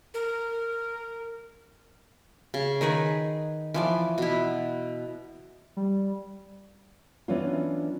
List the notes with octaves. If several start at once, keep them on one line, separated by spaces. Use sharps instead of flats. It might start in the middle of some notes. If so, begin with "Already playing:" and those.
A#4
C#3
D#3 D#4 G#4 B4
E3 F3 D5
B2 E4
G3
E3 F#3 B3 C#4 D4 F4